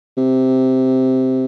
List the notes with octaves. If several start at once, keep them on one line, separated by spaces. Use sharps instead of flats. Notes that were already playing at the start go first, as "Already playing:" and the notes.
C3